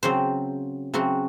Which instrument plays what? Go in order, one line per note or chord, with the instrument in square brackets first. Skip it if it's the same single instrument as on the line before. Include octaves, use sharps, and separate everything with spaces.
[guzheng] C#3 F#3 C4 C5
C#3 F#3 C4 F#4